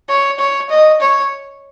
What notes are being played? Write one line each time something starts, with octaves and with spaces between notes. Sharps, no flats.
C#5
C#5
D#5
C#5